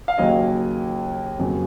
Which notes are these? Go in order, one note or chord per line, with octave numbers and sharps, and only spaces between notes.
F5
D#2 C#3 F#3 A#3 D#5
F2 C#3 F#3 A#3